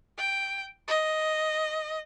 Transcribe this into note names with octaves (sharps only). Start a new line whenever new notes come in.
G5
D#5